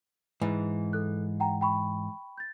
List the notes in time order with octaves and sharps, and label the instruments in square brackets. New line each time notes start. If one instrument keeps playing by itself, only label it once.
[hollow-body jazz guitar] G#2 E3 [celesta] G#5
[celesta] A4 F#6
F#5 G5 A#5
G5 B5 C#6
G6 A6